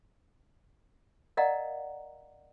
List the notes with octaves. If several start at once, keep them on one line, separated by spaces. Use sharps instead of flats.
A#4 D5 D#5 F5 F#5 A#5